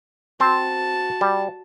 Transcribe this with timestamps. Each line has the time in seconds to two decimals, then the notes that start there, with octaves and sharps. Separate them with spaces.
0.40 C4 F#4 C5 A5
1.21 G3